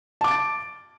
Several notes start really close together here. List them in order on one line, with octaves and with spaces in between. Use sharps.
A5 D6 D7 A6